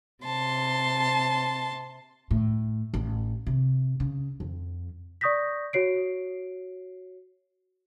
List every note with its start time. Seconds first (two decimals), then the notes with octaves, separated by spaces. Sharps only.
0.24 C3 A5 C6
2.31 A2
2.94 A1
3.47 C3
4.00 C#3
4.40 F2
5.21 D5 C#6 D#6 G6 A#6 B6
5.73 F#4 C#5 C7 D7